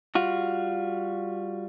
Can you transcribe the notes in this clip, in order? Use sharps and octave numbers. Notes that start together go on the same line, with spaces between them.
G3 F4 F#4